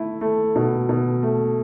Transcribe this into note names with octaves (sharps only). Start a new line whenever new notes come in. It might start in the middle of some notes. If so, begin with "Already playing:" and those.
Already playing: A3 E4
A3
B2
B2
A3